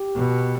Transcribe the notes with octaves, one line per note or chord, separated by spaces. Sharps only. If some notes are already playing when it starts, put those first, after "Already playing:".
Already playing: G4
B2